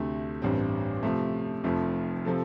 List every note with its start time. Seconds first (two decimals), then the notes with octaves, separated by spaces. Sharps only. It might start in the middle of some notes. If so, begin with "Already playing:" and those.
Already playing: D2 C3 A3
0.42 A1 G2 G3 C4
1.03 C3 F3 A3
1.64 F1 F2 F3 A3
2.25 C3 F3 C4 A4